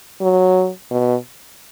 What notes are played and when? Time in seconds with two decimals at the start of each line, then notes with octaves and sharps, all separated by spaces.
0.22 F#3
0.91 B2